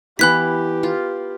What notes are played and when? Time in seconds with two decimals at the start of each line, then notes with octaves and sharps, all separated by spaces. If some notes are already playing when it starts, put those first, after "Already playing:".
0.19 E3 B3 E4 G4 B5 F#6 B6
0.83 F4